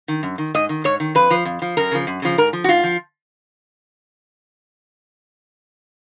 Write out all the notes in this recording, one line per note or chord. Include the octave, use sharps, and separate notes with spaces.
D#3
F#2
D#3
G#2 D#5
D#3
G#2 C#5
D#3
F2 B4
F3
F2
F3
F#2 A#4
C#3 F3
F#2
C#3 F3
G#2 A#4
F3
F#4
G#2 F4
F3